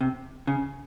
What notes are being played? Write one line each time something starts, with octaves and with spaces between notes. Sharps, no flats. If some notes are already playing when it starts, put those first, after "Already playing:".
C3
C#3